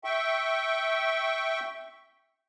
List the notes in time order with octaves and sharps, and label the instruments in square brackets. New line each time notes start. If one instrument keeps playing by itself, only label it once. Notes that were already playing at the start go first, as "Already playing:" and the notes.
[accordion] E5 G5 C#6